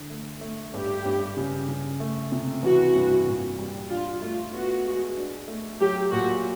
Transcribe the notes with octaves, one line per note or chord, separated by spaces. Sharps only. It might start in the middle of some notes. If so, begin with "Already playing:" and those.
Already playing: D3
A3
A3
G2 G4
G2
C#3
C#3
A3
C3
E3 F#4
G2
A#2
G3
D4 F4
A3 F4
B3 F#4
G#3
D4
A3
F#3 G4
A#2 F#4